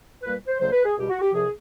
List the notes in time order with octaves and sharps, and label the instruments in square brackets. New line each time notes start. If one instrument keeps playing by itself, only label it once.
[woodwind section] A#2 G3 A#3 B4
C5
D2 C#3 F#3 A#3 C5
B4
G#4
C#2 B2 G3 G4
F#4
G4
C2 C3 F3 G#4